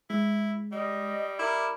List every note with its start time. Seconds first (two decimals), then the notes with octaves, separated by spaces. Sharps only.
0.10 G#3 E4
0.72 G3 D#5
1.39 E4 A#4 D6